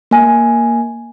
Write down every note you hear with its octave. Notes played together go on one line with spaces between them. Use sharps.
A#3 G#5